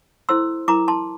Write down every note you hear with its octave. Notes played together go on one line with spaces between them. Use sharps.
E4 A4 C5 C6 E6
E4 A#4 A#5 D6
A5 C6